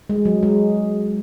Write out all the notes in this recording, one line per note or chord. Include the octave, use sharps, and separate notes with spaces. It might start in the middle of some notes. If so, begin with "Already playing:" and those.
G#3
F#3
G#3